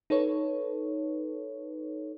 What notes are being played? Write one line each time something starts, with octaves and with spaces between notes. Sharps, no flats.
D#4 A4 B4 C#5